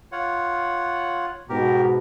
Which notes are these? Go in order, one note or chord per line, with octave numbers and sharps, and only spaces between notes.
F4 C#5 F#5
G#2 B2 G4 A#4